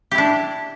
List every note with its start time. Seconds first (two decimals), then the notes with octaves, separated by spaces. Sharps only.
0.11 G4
0.15 E4
0.18 D4